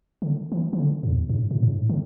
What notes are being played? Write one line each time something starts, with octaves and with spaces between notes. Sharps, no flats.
D3
E3
E3
D3
G2
E2
G2
A2
G2
A2
D3